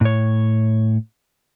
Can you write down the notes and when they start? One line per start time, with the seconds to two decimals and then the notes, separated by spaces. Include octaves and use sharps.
0.01 A2 C#5